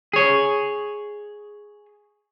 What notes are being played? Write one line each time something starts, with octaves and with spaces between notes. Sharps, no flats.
G#4 C#5